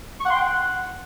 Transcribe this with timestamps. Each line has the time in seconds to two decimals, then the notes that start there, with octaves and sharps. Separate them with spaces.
0.20 C#6
0.25 F#5
0.30 C6
0.35 G5
0.40 F#5